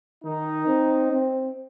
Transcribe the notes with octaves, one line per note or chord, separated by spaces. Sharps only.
D#3 D#4
C4
C4